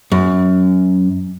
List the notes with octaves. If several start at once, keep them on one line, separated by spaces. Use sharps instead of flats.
F#2